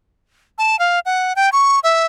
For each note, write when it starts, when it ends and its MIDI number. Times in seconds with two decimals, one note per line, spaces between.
0.58 0.79 81
0.79 1.00 77
1.06 1.33 78
1.36 1.49 79
1.52 1.79 85
1.84 2.06 76